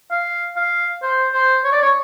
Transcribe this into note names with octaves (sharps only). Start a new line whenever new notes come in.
F5
F5
C5
C5
C#5
D5
C#5